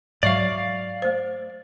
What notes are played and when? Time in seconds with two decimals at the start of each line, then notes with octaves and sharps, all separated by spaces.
0.23 G#2 F#3 C#5 D5 E5 F5 C#6
1.02 A3 C5